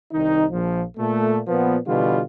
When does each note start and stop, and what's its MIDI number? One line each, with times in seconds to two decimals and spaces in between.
0.12 0.45 36
0.12 0.45 51
0.12 0.45 63
0.52 0.82 34
0.52 0.82 53
0.98 1.39 46
0.98 1.39 57
1.47 1.77 46
1.47 1.77 53
1.47 1.77 59
1.86 2.21 47
1.86 2.21 50
1.86 2.21 52
1.86 2.21 55
1.86 2.21 65